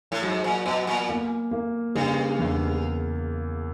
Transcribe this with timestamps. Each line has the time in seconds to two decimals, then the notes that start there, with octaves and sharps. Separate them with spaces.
0.12 A2
0.22 G#2 F#3
0.44 A#2
0.66 B2 B3
0.87 A#2
1.09 A#3
1.51 A#3
1.95 G2 C#3
2.39 E2